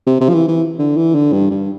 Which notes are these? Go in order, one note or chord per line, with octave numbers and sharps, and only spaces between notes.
C3
C3
F3
E3
E3
D3
E3
D3
G2
G2